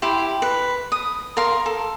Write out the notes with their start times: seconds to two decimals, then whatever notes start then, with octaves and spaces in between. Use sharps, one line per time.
0.02 E4 G4 C5 G5
0.42 B4
0.92 D#6
1.37 A#4 F5 C6
1.66 A4